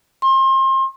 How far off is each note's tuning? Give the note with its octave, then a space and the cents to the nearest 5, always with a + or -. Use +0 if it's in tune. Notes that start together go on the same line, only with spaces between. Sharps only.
C6 +30